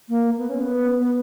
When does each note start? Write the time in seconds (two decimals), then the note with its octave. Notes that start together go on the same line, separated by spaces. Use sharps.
0.09 A#3
0.38 B3
0.49 C#4
0.59 B3
1.00 B3